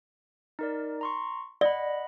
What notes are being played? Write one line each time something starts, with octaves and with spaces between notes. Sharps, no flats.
D#4 A#4 D5
A#5 C6 C#6
D5 D#5 F#5 B5